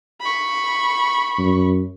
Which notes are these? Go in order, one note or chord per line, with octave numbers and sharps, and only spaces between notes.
B5 C#6
F#2